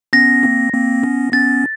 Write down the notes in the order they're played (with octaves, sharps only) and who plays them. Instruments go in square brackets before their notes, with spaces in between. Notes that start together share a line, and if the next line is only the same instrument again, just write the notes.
[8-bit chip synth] B3 C#4 [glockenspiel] A#6
[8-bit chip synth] A#3 C4
A#3 C4
B3 C#4
[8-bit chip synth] B3 C#4 [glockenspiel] A6